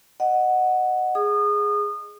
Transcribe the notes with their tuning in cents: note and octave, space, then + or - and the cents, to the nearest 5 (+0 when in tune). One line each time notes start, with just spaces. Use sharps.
D#5 -15 F#5 +0
G#4 +0 D#6 -30